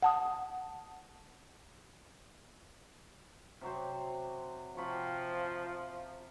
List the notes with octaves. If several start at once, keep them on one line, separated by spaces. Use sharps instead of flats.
F#5 A5 D#6
C3 F#3 C5
C3 F3 B5 C#6